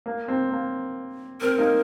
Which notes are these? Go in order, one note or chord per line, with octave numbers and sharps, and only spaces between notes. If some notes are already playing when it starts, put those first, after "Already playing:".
A#3
C4
A#3
C4 A#4
A#3 D#4